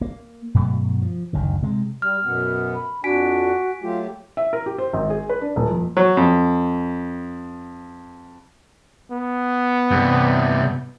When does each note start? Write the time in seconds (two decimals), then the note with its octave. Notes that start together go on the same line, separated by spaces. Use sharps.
0.01 A#3
0.55 G2 B2 F#3 A3
1.02 F3
1.33 F#1 D2 D#3
1.63 C3 G#3
2.02 G3 F6
2.24 F#2 B2 B3
2.74 B5
3.04 F2 D4 F#4 G#5 B6 D7
3.82 F#3 A3 F4 G4
4.37 E5
4.53 A#4
4.66 G4
4.78 C5
4.93 G#1
5.10 G#4
5.29 B4
5.41 D4
5.56 D#1
5.69 F2
5.97 F#3
6.17 F2
9.11 B3
9.91 G2 C3